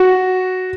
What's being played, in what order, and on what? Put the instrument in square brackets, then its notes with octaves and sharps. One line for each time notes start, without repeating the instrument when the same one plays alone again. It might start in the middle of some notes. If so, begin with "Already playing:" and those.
Already playing: [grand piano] F#4